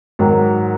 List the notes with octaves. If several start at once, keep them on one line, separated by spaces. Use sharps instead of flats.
G#2 D#3 F#3